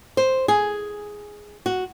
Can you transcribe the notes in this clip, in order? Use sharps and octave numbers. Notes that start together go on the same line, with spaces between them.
C5
G#4
F#4